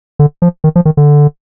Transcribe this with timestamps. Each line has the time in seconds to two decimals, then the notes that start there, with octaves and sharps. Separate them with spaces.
0.19 D3
0.42 F3
0.64 D#3
0.76 F3
0.85 D#3
0.97 D3